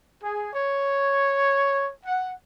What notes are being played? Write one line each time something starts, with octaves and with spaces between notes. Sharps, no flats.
G#4
C#5
F#5